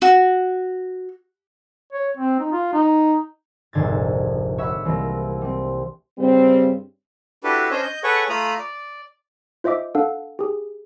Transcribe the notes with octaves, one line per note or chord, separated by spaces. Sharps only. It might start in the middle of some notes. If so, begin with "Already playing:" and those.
F#4
C#5
C4
D#4
F4
D#4
F1 A#1 G#2 D3 G#6 A6
C#5 E5 F#5 B5
C2 E3 A#3 A#6
G3 C4
G2 C#3 G3 C4
D4 E4 F#4 G4 A4 B4
C#4 D4 C5 C#5 D#5
D#5 G6
G#4 A4 B4 C#5 F#5 C#6
A3 F4 A#5 B5 D#6
D5
F4 C5 D#5 E5 D6
D4 A4 F5 F#5
G4 G#4